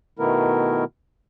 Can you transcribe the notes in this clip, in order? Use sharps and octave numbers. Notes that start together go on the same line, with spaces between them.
B2 D#3 A3 B3 E4 A#4